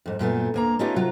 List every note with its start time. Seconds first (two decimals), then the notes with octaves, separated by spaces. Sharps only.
0.06 F2 G#2
0.19 F#2 A#2 A3 B3
0.54 D2 A#3 A#5
0.79 A3 B3 C#4 D#4 F4 G4
0.96 C3 F#3 F4